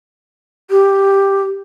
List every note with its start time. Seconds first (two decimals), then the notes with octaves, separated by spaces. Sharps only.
0.70 G4